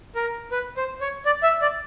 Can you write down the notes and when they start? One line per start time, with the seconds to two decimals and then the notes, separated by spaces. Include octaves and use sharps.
0.15 A#4
0.52 B4
0.77 C5
1.01 C#5
1.26 D5
1.43 E5
1.61 D5